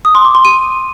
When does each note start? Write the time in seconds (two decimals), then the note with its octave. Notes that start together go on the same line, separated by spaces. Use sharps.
0.05 D#6
0.15 C6
0.25 D6
0.35 C6
0.45 D#7